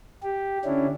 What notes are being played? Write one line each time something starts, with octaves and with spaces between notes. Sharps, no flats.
G4
D3 C#4 D4 E4